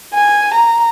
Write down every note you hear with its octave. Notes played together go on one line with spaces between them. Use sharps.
G#5
A#5